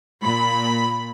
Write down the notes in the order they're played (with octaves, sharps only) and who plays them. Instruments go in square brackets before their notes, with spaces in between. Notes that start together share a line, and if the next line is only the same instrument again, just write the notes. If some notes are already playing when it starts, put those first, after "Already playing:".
[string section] A#2 B5